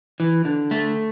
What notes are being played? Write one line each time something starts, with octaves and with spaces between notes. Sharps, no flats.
E3
D3
A3